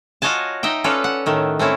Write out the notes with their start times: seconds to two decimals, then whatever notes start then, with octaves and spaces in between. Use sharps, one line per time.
0.22 F4 F#4 C#5 D#5 G#5 A5
0.63 D#4 D#5 E5 G5
0.84 C#4 F4 A4 B4 C#5 D5
1.04 F#5
1.26 A2 D#3 A3
1.59 A3 C4 C#4 E4